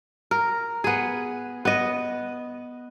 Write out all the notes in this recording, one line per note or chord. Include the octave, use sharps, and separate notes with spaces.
A#4
B3 G#4
B3 D#5